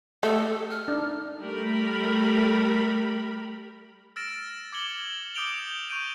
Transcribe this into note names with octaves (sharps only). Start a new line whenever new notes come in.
A3 G4 A4 D#5
F6
D4 D#4
G3 A3 A#4 B5
E6 F6 A6 A#6 D7 E7
D6 G#6 C#7 F#7 G7
D6 D#6 G6 D7 F7 G7
C#6 G6 D7 D#7 F7